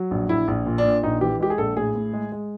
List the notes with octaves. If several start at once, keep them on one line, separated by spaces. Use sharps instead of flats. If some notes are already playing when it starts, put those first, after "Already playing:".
Already playing: F#3
A#1
A#1 E4
A#1
A#2
D4
A#2
A#1 D#4
E3 G4
G#3 G4
G#4
A#1 A4
A2 G#4
A2
G#3
G#3